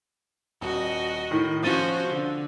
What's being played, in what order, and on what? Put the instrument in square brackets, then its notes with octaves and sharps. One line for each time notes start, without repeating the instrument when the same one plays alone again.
[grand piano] D#1 [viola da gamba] F#4 D#5
[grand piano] A2 D#3
[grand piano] F3 A6 D#7 [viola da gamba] C#4 F#4 C5
[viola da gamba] D3